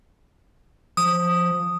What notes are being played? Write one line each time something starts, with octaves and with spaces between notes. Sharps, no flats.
F3 D#6